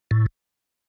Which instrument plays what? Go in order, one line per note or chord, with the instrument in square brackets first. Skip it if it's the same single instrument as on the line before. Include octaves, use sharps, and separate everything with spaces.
[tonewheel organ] A2